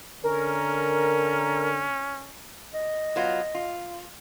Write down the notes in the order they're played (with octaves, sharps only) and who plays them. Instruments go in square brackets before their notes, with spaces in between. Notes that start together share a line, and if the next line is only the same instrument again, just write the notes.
[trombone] D3 [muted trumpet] C#4 [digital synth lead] A#4
[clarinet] D#5
[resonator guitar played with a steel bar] F#3 B3 F4
F4